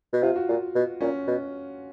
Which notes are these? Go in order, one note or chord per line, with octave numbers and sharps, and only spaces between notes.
B2
C3 F4
F#4
A#2 F4
B2
A#2 C#4
B2